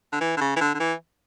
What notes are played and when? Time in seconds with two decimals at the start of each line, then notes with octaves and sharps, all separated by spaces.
0.13 D3
0.21 E3
0.37 D3
0.41 C#3
0.56 E3
0.61 D3
0.74 D3
0.80 E3